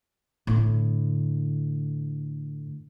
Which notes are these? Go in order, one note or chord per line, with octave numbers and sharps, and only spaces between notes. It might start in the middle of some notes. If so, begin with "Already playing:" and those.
A2 D3